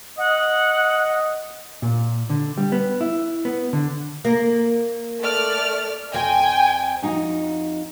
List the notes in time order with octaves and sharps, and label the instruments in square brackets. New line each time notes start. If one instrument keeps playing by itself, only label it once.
[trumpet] D#5 [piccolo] F#5
[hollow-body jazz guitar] A#2
D3
G3
B3
E4
B3
D3
[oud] A#3
[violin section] A3 D5 F6
[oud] F2 [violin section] G5 G#5
[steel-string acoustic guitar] F2 D#4 F#4